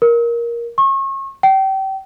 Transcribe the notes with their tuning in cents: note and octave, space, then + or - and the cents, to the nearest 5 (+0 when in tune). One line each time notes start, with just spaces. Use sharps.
A#4 +10
C#6 -35
G5 -30